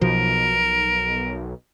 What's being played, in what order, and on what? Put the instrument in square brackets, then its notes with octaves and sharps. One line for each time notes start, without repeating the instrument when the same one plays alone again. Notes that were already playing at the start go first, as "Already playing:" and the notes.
[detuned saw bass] B1 [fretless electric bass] B2 F3 [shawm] A#4